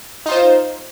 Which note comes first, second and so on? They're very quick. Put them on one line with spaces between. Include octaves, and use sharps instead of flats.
D#4 F4 C5